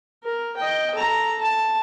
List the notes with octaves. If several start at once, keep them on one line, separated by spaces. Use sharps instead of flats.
A#4
D#5 G5
A4 A#5
A5